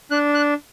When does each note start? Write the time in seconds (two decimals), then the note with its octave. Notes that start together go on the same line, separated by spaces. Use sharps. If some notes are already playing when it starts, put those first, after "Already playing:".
0.11 D4 F#6
0.34 F#6